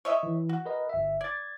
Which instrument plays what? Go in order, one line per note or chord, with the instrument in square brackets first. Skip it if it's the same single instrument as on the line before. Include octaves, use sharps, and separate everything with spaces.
[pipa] C#5 D#5 E5
[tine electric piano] E3
[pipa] F#4
[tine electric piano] A#4 B4 D#5
G1 E5
[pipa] D5 [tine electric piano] G#6 A6